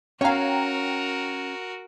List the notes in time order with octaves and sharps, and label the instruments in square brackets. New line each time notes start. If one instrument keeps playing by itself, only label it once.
[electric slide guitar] C#4 [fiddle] F#4 A#4 [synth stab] C#5 F5 [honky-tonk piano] G5 A#5